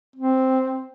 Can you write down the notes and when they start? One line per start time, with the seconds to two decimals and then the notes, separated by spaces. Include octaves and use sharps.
0.16 C4